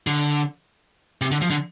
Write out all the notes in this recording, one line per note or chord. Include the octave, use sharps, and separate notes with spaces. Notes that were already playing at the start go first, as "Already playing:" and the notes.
D3
C3
D3
F3
D3